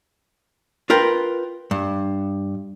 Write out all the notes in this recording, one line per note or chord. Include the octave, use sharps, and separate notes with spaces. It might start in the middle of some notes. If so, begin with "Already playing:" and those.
F4 A#4 B4 G5
G2